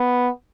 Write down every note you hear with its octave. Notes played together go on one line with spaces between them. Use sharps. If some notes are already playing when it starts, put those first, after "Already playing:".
Already playing: B3